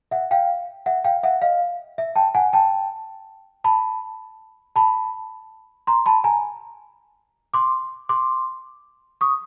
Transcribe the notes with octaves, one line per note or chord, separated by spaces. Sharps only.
E5 F#5
F5 G5
E5 F#5
F5 G5
E5 F#5
D#5 F5
E5
G5 A5
F#5 G#5
G5 A5
A5 B5
A5 B5
A#5 C6
A5 B5
G#5 A#5
C6 D6
C6 D6
C#6 D#6